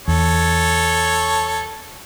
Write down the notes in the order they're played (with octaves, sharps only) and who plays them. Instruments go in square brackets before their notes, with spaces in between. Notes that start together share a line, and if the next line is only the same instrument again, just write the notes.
[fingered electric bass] E2 [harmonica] A4 C#5